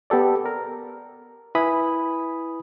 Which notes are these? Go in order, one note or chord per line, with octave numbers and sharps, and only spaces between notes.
B3 G4 A4 D5
A#4
E4 B4 G#5 B5 D#6